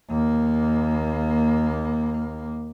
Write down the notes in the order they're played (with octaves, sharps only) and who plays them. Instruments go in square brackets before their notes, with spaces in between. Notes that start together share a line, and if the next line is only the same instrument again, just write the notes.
[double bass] D#2 A#3